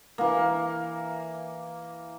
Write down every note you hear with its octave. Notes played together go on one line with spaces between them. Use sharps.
E3 A#3